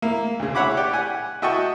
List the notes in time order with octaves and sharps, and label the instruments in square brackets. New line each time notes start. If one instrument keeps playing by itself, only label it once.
[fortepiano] A#3 E4
D2 C#3
E4 C#5 F#5 B5 D6
G4 D5
F#5 G#5
E4 F#4 D#5 G5 A5 C#6